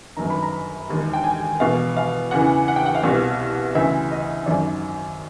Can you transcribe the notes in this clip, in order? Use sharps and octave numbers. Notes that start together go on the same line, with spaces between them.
G1 F#2 D#3 A#5
B5
A#5
E1 D#2 D#3
G5
G#5
E1 E2 B2 F5
F5
E2 C#3 E3 F#5
F#5
G5
F#5
F5
C2 B2
D2 C#3 E3 E5
D#5
G#1 F#2 D#3 D5